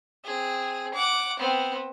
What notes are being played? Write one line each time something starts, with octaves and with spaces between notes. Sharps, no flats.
C4 G#4
F#5 D6
B3 C4